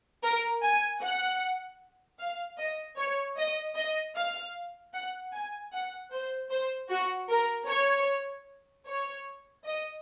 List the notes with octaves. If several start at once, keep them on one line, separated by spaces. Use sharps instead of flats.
A#4
G#5
F#5
F5
D#5
C#5
D#5
D#5
F5
F#5
G#5
F#5
C5
C5
F#4
A#4
C#5
C#5
D#5